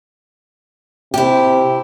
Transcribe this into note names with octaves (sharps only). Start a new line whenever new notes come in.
C3 E4 G4